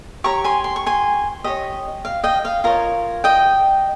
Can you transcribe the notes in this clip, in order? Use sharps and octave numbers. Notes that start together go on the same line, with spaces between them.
G4 C#5 A#5 C#6
G#5 C6
C6
C#6
G#5 C6
G4 C#5 D#5
F5
D#5 G5
F5
F4 A#4 C#5 D#5
D#5 G5